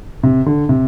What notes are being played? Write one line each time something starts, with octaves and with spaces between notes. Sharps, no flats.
C3
D3
C3